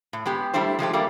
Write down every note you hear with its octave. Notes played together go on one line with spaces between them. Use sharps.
A2
G#3 B3 G4
G3 A3 D4 E4 C5
F3 G#3 A3 G4
G3 A3 A#3